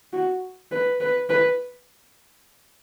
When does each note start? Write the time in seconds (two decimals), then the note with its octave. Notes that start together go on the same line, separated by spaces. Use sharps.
0.13 F#4
0.72 B4
1.01 B4
1.29 B4